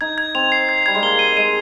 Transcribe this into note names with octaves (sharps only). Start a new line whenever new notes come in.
D#4 G#6
G#6
C4 F7
C7
G#6
G3 G#6
G#3
A#3 G7
D#7
G#3 D#7